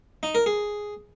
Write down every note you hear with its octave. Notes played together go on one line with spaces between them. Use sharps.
D#4
A#4
G#4